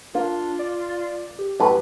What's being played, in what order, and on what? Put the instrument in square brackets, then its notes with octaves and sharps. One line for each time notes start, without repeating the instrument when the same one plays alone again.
[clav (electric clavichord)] A#3 [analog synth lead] D4 [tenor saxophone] F4
[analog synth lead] D5
G4
[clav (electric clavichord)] F#2 A2 [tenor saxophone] B4